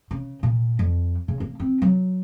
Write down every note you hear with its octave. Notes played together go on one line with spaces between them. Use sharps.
C#3
A#2
F2
C#3
A#3
C4
F#3